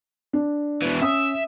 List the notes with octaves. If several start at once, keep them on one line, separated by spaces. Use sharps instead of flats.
D4
B2 E3
C#4 E5 D#6